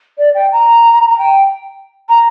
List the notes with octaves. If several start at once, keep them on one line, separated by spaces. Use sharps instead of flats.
D5
G5
A#5
A#5
G5
A#5